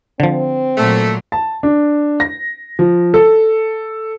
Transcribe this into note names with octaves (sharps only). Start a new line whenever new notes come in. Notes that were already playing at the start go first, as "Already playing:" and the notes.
D3 F3 C4
A#2 F#3 A3
A5
D4
A#6
F3
A4